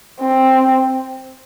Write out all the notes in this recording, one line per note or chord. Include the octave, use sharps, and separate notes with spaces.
C4